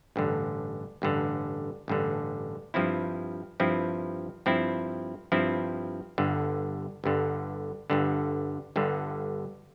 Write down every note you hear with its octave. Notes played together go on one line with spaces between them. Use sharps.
A1 G2 D3
A1 G2 D3
A1 G2 D3
G2 F3 C4 E4
G2 F3 C4 E4
G2 F3 C4 E4
G2 F3 C4 E4
G1 G2 D3
G1 G2 D3
G1 G2 D3
G1 G2 D3